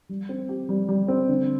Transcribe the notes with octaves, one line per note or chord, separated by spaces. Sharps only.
G3
C4
G4
G3
G3
C4
D3